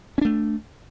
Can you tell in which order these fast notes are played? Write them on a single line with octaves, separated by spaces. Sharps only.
C#4 D4 A3